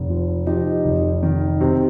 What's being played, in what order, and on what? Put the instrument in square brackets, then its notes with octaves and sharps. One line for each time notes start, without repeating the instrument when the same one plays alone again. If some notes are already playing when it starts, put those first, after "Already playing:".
Already playing: [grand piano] F1
F3
F3 D#4 G4
F1
D#3
C3